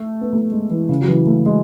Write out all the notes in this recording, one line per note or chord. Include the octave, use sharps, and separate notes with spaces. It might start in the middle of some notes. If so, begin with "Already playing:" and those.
Already playing: A3
B3
A3
G#3
E3
C#3
F#3
E3
A3
G#3